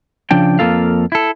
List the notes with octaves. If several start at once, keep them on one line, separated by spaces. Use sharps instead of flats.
C#3 F3 D4 G5
F2 D3 A#3 F4 A4 F5
E4 A4